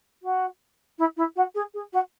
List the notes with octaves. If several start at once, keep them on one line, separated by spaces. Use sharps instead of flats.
F#4
E4
E4
F#4
G#4
G#4
F#4